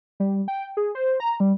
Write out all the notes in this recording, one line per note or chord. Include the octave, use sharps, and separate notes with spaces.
G3
G5
G#4
C5
A#5
G3